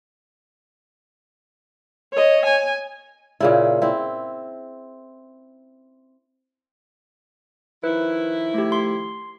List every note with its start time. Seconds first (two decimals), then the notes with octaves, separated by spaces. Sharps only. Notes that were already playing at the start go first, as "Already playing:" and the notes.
2.13 C#5 D#5
2.46 G#5
3.40 A#2 C#3 E4
3.82 C4 E4
7.84 D#3 F3 E4 B4
8.54 A3 G4
8.72 C6 C7